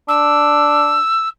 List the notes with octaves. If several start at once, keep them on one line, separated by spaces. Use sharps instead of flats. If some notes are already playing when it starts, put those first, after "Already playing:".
D4 E6